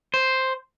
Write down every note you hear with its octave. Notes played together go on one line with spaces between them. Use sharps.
C5